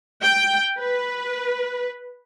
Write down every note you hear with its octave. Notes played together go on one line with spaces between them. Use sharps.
G5
B4